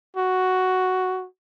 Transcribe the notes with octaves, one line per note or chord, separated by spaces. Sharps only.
F#4